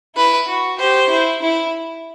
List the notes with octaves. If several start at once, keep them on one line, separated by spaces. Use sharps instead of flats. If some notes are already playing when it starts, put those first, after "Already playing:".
E4 B4
F#4
G4 C5
E4
E4